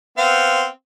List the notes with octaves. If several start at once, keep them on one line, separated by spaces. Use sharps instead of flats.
B3 C4 F5